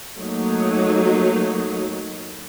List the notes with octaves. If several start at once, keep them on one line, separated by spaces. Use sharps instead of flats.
F#3 A3 A#3 D#4